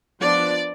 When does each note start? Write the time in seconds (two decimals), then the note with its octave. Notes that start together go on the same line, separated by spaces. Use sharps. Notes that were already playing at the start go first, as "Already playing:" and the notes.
0.19 F3 B3 D4 D5